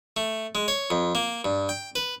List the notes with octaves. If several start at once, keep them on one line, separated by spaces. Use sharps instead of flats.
A3
G#3
C#5
F2
A#3
G2
G5
B4